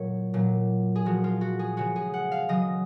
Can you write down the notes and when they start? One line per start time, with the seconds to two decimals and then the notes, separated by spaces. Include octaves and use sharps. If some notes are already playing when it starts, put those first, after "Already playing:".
Already playing: A#2 F#3 C#5
0.34 A#2 F#3
0.96 G#4
1.05 A#2 F3 G#3 F#4
1.24 F4
1.41 F#4
1.59 G#4
1.77 C#3 G#3 F#4
1.96 G#4
2.14 F#5
2.32 F5
2.49 C#3 F#3 D#5